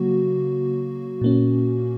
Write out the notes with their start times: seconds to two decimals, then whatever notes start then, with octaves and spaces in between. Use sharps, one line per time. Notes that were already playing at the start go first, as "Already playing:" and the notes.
Already playing: C#3 F#3 A#3 F#4
1.21 A#2 A#3 C#4